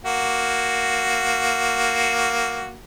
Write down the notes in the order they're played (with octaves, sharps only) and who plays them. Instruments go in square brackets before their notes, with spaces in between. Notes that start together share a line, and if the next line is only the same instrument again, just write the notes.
[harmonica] A#3 F#4